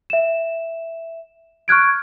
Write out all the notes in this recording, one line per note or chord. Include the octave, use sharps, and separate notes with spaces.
E5 E7
C#6 F6 F#6 G#6 D7